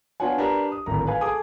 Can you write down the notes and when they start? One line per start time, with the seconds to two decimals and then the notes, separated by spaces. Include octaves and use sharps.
0.20 B3 D4 F4 C#5 F#5 G#5
0.38 D4 G4 A#4 B4 A#5
0.72 D#6
0.86 D1 G#1 A#5
1.07 B4 F5 G#5
1.21 G#4 A4 G#5 D6 D#6